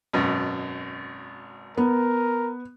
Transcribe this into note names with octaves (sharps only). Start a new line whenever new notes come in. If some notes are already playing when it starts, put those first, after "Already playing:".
G#1 F#2 B2
B3 A#4